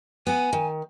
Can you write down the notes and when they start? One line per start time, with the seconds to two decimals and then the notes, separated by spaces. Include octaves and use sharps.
0.27 B3 F#5 G#5
0.53 D#3